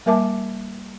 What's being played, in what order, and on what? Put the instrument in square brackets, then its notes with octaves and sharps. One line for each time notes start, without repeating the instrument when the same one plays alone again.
[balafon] G3 A#3 A#4 E5 A5 D6